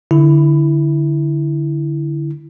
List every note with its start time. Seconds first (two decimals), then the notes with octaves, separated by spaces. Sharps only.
0.11 D3 E4